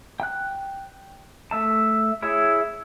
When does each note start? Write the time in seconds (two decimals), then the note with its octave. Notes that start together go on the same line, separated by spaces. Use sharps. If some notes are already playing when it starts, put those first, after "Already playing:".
0.20 G5 F#6
1.51 A3 E5 A5
2.22 E4 G#4 C#5 E5